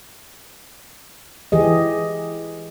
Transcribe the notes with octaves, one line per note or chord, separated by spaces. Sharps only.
E3 G4 G#4 D#5